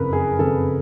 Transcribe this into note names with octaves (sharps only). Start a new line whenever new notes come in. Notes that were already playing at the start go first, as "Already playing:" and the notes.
Already playing: F#1 F2 C#3 A#4 B4
G#4
F#1 F2 C#3 A4